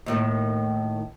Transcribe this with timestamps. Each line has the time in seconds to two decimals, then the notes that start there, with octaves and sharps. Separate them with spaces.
0.06 D#2 A2 D#3